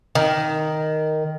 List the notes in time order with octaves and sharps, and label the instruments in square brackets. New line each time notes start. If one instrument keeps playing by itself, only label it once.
[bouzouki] D#3